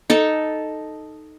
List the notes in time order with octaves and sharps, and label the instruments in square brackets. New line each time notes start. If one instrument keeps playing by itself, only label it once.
[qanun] D#4 A4 A5